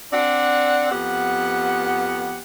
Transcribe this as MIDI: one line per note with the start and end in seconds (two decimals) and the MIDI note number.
0.13 0.88 60
0.13 0.88 62
0.13 0.88 74
0.13 0.88 78
0.92 2.40 41
0.92 2.40 59
0.92 2.40 67
0.92 2.40 78